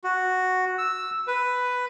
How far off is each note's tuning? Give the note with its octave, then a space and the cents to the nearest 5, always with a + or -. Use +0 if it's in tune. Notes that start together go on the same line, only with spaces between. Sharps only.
F#4 +0
E6 +0
B4 +5